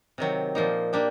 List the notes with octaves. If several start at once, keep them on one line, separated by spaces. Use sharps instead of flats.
C3 D#3 F#3
A#2 F3 A#3 D#4
A#3 D4 G4